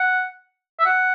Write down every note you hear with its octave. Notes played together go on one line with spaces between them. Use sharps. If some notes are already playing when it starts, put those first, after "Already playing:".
Already playing: F#5
E5
F#5